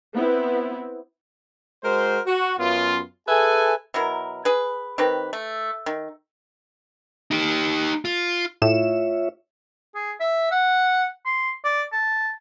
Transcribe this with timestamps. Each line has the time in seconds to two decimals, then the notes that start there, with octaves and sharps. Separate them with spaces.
0.14 B3 C4 E4
1.84 G#3 F#4 A#4 C5
2.26 F#4
2.59 F#2 B3 F4
3.28 G#4 A4 B4 E5 G#5
3.94 B2 F#3 E4 A#4
4.45 G#4 B4
4.98 D#3 C4 G4 B4
5.33 A3
5.86 D#3
7.31 D#4 G4
8.05 F4
8.62 A2 F4 C#5 E5 E7
9.95 G#4
10.20 E5
10.51 F#5
11.26 C6
11.64 D5
11.92 A5